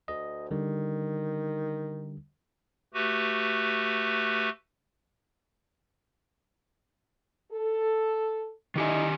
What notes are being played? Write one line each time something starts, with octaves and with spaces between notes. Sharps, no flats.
D2 D#5
D3 D#3 G3
A3 F#4 G4 B4
A4
D3 D#3 D#4 E4 G4 G#5